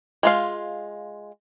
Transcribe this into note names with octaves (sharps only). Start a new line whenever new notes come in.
G#3 F4 F5